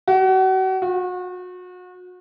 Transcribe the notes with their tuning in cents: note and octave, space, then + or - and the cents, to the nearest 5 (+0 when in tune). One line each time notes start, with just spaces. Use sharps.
F#4 +35
F#4 -35